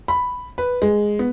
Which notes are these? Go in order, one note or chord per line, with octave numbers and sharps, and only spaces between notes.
B5
B4
G#3
B3